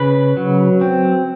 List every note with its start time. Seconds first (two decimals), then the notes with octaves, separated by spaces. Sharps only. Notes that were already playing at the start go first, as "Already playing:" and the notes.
Already playing: C#3 B4 B5
0.37 F#3
0.81 C4